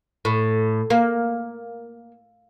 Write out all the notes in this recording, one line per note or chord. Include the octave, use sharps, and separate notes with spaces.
A2
A#3